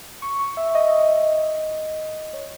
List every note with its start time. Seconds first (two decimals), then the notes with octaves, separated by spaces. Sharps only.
0.22 C#6
0.39 C#6
0.57 E5
0.75 D#5
2.33 C#5